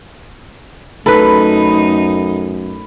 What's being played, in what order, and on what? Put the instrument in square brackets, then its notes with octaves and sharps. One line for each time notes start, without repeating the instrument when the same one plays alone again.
[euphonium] F#2 [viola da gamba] A3 D#4 [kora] A4 B4 [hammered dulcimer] B5